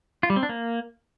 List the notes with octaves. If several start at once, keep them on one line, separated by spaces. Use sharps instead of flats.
F4
G3
C4
D4
A#3